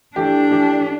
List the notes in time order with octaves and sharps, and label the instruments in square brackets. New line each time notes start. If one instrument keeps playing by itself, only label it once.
[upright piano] E3 A3 G4 [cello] D4
[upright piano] E3 A3 G4